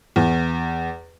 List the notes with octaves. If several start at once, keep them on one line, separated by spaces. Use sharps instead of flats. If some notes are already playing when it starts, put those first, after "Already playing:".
E2